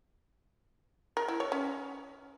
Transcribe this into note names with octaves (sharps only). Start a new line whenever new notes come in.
A#4
E4
C#5
C#4